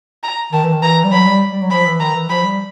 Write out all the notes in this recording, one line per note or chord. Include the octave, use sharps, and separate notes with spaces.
A#5
D#3 A5
E3
D#3
E3 A#5
G3
F#3 B5
G3
G3
F#3
F3 B5
E3
D#3 A#5
E3
F3 B5
G3